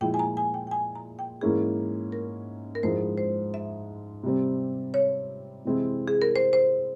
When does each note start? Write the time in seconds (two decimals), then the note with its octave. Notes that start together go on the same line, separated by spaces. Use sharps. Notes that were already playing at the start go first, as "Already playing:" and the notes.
0.01 A#2 F3 G#3 E4 G5
0.14 G#5
0.19 A#5
0.37 G#5
0.54 G5
0.67 G5
0.71 G#5
0.95 A#5
1.19 G5
1.41 G#2 E3 A#3 C#4 E4 G#4
2.12 A#4
2.75 A#4
2.83 G#2 F3 G#3 E4 C5
3.17 C5
3.54 E5
4.23 C3 G3 C4
4.94 C#5
5.65 C3 E3 G#3 C4 E4
6.08 G#4
6.22 A#4
6.36 C5
6.53 C5